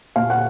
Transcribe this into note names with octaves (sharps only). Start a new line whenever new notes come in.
A#2 F5
F#5